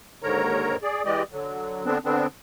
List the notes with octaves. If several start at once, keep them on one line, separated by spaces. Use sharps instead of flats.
D#2 G#2 D3 A#4 C#5 A#5
G#4 D5
E3 G#3 G4 D5 D#5
D3 F#3
D3 B3 C4 D4
D3 B3 C4 D4